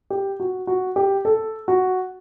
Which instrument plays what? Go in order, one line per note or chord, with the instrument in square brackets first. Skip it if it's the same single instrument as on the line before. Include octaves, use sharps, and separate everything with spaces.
[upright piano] G4
F#4
F#4
G4
A4
F#4